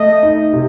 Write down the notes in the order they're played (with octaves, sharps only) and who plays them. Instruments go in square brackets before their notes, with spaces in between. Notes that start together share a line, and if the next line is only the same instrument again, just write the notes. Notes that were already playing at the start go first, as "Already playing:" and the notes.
Already playing: [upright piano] A3 [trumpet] D#5
[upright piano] D#4
C3